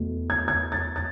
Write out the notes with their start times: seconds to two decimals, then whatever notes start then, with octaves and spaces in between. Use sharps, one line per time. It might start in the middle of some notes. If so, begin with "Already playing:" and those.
Already playing: E2 B2 A3
0.30 G#6
0.48 G#6
0.72 A6
0.96 A6